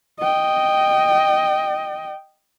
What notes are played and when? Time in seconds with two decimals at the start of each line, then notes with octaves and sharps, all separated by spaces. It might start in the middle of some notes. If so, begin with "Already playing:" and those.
0.20 D#5 G5